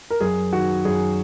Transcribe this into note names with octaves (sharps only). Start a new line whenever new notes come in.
A#4
F#2 G#4
D#3 F#4
F#2 G#4